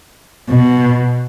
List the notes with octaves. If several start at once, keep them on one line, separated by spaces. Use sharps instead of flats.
B2